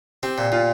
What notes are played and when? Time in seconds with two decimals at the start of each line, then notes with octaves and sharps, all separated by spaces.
0.23 C4 G4
0.38 A#2
0.52 A#2 F4